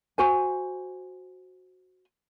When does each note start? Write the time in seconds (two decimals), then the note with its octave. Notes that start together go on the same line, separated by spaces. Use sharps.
0.18 F#4 C5 G#5